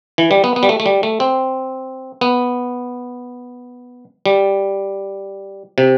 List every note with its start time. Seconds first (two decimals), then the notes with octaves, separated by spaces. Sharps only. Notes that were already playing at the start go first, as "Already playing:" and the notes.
0.18 E3
0.31 G3
0.44 B3
0.56 B3
0.63 G3
0.69 A3
0.80 A3
0.86 G3
1.03 A3
1.20 C4
2.21 B3
4.26 G3
5.78 C3